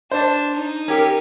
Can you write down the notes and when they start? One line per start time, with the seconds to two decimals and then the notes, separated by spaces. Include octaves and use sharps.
0.11 D4 C5 A5
0.55 D#4
0.88 C#4 G4 A#4